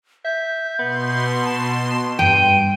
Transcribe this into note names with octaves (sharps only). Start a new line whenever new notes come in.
E5 G6
B2 B3 C6
A5
G2 G5 D#7